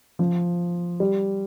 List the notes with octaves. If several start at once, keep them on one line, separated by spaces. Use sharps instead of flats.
F3
G3